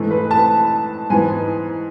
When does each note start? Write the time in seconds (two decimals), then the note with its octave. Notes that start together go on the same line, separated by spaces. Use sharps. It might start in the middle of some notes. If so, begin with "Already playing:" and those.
Already playing: G#2 E3 A3
0.11 B4
0.31 A5
1.10 G#2 E3 B3 G#5